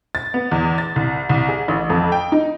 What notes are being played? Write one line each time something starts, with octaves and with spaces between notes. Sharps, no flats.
A6
B3
E2
A6
C2
C2
G#4
A1
F2
G5
D#4